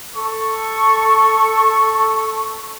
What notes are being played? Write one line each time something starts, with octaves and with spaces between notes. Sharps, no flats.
A4 C#6